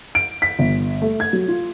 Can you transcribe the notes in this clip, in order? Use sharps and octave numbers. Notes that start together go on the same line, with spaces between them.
D7
B6
G1
A3
G#6
F#3
F4